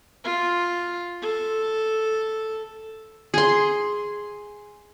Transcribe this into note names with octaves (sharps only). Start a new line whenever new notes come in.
F4
A4
G#4 C6